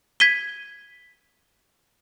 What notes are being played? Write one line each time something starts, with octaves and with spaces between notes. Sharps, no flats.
G#6 B6 D#7 G7